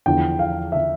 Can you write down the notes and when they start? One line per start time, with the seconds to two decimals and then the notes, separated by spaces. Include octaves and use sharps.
0.06 E2 D3 F3 G5
0.39 F5
0.72 D3 F3 E5